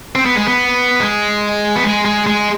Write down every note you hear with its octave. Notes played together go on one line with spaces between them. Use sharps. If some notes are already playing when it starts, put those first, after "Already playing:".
C4
B3
G#3
B3
G#3
B3
G#3
G#3
G#3